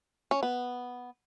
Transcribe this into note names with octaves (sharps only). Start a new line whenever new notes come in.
C#4
B3